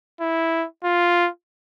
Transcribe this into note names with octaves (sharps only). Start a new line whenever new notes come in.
E4
F4